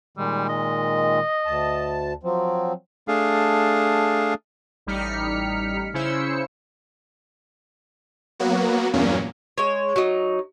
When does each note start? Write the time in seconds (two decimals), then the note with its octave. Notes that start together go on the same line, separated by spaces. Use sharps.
0.17 A#2 D#3 G3 G#3
0.49 D#5
1.46 D2 A5
2.23 F3 F#3 C4
3.08 A3 D4 G#4 F5
4.86 A1 G3 D#4 F6 B6 C#7
5.94 C#3 C#4 E4 C5 E6 C#7
8.40 F#3 A#3 B3 F#4
8.93 E2 G2 A#2 F#3 A#3 C#4
9.58 G#3 C#5
9.96 F#3 D#4